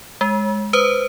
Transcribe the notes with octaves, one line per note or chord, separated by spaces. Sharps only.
G#3
B4 C5 D#6